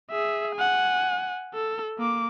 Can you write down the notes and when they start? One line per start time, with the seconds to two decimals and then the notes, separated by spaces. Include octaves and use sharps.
0.11 G#4 E5
0.56 F#5 G#5
1.54 A4
1.98 A#3 D6